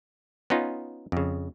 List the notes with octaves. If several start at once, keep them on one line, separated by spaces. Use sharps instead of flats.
B3 C#4 D#4 F4
F2 C#3